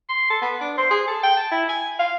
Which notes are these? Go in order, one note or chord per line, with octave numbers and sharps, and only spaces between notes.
C6
A4
B3
D4
C5
G#4
A4
G5
A5
E4
G#5
F5